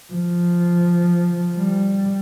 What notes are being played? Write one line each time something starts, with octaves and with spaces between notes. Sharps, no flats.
F3
G3